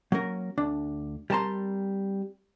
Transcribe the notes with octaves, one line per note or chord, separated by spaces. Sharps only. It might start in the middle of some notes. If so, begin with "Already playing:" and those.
F#3 A#3 C#4 A#4
D2 D4
G3 C4 A#4 A5 A#5 C6